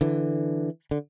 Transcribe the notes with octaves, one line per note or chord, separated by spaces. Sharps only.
D3 E3
D3